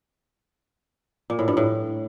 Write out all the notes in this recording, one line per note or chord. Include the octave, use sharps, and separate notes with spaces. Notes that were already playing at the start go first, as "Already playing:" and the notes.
A#2
A2
G2
A2